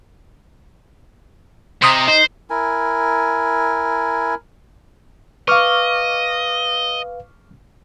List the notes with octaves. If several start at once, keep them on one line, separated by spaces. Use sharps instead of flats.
C3 C5 D#5 A#5
D#4 C5
E4 A#4 G#5
B4 D#5 F5 C#6 D6 F6